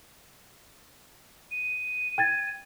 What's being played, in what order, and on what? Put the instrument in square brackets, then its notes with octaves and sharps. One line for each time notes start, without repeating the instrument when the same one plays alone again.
[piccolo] D#7
[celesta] G5 G#6 A6